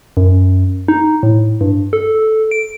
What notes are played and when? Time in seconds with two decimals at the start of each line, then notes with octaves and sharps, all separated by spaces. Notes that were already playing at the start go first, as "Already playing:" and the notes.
0.17 F#2
0.88 D#4
1.23 A2
1.61 G2
1.93 A4
2.51 D7